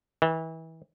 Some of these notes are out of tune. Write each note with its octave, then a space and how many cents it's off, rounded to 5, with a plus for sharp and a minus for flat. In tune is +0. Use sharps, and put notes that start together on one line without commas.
E3 -30